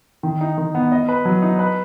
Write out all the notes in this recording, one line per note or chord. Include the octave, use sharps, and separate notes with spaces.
D#3
D#4
D#3
B3
D#5
B4
F#3
D#4
B4